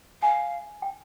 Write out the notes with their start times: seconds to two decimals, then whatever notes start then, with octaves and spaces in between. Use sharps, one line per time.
0.22 F5 G#5
0.82 G5